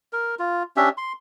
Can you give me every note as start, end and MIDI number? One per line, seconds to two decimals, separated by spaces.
0.13 0.35 70
0.39 0.63 65
0.77 0.89 61
0.77 0.89 62
0.77 0.89 67
0.77 0.89 76
0.97 1.13 84